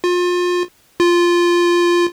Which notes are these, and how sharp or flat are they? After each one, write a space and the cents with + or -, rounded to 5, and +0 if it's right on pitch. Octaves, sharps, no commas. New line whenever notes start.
F4 +30
F4 -5